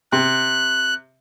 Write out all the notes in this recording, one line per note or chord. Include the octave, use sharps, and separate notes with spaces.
C3 F#6